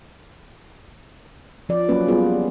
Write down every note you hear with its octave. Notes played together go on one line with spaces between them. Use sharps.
F3 D5
F#3 A#3 C#4 B4
G3 B3 F4 G#4 B4